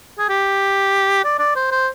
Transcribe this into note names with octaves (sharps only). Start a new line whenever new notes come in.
G#4
G4
D5
D5
C5
C5